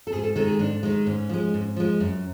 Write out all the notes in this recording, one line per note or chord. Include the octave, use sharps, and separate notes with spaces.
A4
G#2 G#4
A4
D#3 G#3 A4
G#4
G#2 D4
D#3 G#3
G#2 C#4
F3 G#3
G#2
F3 G#3
F#2